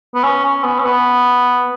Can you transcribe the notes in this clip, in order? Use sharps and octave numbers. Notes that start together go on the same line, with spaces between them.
B3
C#4
C#4
B3
C#4
B3